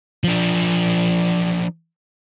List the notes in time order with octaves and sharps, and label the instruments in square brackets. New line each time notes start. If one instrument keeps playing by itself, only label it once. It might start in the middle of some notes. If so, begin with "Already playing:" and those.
[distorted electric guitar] F3 D4